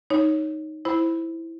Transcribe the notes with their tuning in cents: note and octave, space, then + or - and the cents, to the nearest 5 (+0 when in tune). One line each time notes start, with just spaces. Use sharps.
D#4 +0 C#5 +0
E4 +0 C5 +0 B5 +0